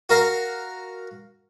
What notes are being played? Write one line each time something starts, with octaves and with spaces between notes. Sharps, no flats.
F#4 A#4 F5